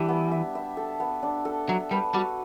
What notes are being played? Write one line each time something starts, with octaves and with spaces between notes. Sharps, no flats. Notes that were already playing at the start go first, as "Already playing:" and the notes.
Already playing: E3 G3 D4 E5
B3
E5
E5
A4
B3
D4
A4
F#3 E5
G3 B4
G3 F#4